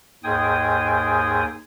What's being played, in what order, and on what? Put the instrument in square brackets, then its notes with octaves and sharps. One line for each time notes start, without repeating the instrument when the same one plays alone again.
[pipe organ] D#2 G#2 G#4 G5 G#5 D#6